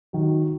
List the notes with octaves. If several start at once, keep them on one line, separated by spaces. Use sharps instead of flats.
D#3 F#3